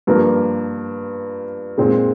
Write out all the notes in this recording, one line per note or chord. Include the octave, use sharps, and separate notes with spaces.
G2 F3 A#3
A#2 G#3 C4 D#4